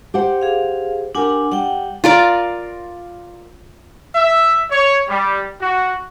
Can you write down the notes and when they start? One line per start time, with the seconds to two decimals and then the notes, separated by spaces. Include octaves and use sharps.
0.14 G4 C5 F#5
0.41 G#4 F5
1.15 D4 G4 A#4 F#5 G#5
1.52 G3 F#5 G5
2.04 F4 A#4 D5
4.15 E5
4.70 C#5
5.08 G3
5.61 F#4